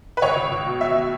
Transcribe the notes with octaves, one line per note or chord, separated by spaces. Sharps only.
B4
C#2 C#5
C#2
C#2
B2
B2 E5
B2